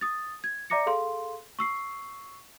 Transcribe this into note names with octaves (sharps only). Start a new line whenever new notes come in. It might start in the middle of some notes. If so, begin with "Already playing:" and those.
D#6 A6
G#6
D5 E5 A#5 D6 A#6 C#7
G#4 A4 F5 C6
C#6 E6 C7